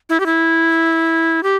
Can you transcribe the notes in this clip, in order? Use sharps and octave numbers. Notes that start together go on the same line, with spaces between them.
E4
G4
E4
G4